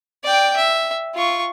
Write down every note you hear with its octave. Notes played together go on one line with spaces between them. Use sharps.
D5 G5
E5
F4 C#6